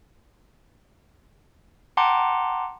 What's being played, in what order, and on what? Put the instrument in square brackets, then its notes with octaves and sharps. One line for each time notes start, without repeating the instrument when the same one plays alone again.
[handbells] F#5 G5 A5 A#5 C6 D6